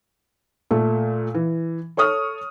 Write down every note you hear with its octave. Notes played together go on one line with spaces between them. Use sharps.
A#2 A3
E3
A4 C#5 C#6 D#6 F6